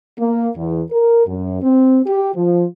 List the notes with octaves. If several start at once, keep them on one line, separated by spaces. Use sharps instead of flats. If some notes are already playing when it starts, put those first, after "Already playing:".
A#3
E2
A#4
F#2
C4
G4
F3